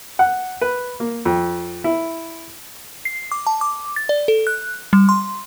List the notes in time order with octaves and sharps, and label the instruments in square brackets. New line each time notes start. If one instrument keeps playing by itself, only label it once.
[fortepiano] F#5
B4
A#3
F2
E4
[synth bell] C7
D6
A5
D6
A6
D5
A4
F#6
G3
C6